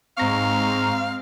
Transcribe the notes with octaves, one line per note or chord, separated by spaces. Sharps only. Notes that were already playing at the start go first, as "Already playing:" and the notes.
G#2 G#3 C4 F5 A#5 C#6